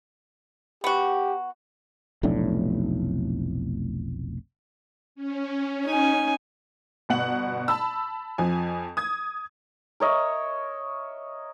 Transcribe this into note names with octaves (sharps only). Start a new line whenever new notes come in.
B3 F#4 G4
F1 B1 A2 D4
C#4
D#4 G#5
G1 B2 F#5 F#7
A5 B5 E6
F2 F3 G#5
D#6 G#6
A#4 C#5 D#5 E5